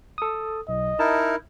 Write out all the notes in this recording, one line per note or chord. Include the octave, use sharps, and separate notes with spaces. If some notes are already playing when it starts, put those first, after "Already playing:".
A4 D#6
B1 D#5
D#4 E4 A#4 A5